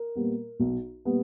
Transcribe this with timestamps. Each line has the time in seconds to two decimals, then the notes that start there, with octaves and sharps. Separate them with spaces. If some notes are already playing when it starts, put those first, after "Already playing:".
Already playing: A#4
0.15 A#2 G3 B3
0.60 B1
1.05 A#2 G3 B3